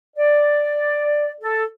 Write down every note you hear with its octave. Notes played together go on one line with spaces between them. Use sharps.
D5
A4